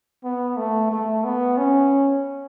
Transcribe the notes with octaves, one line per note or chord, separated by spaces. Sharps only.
B3
A3
A3
B3
C#4